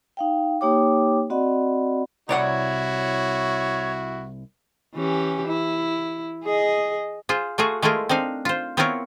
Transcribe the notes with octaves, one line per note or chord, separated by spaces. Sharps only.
D#4 F5 G5
A#3 D#4 G4 C#5 G5 D6
C4 F#4 D5 D#5 F#5 B5
C2 E4 F#4 C#5 D5 F#5
E3 C#4 G4
E4
G#4 D#5
F4 G#4 C5
A3 F4 F#4 G#4
G#3 A3 E4 F4 G#4 A#4
C4 D4 D#4 F5
F4 C5
B3 C4 E4 F4 A#4 C#5